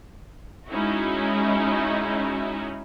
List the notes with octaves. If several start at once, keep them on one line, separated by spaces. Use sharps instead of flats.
G#3 C#4 D#4 E4 F#4